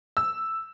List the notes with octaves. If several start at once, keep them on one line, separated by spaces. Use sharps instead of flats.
E6